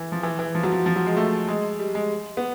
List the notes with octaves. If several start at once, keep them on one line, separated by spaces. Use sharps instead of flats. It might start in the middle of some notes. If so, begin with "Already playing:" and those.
Already playing: E3
F3
E3
E3
F3
F#3
F3
F3
F#3
G#3
A3
G#3
G3
G#3
B3